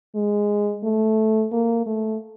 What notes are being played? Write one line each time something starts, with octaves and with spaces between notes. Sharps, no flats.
G#3
A3
A#3
A3